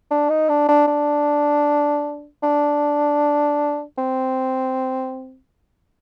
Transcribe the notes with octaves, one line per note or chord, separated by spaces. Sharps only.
D4
D#4
D4
D4
D4
D4
C4